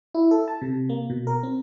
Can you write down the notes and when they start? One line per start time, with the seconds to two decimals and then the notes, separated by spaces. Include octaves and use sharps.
0.14 E4
0.31 A4
0.48 A5
0.61 C3
0.89 A#3
1.10 B2
1.27 A#4
1.43 C4